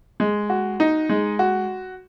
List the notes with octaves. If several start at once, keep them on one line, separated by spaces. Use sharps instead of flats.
G#3
F#4
D#4
G#3
F#4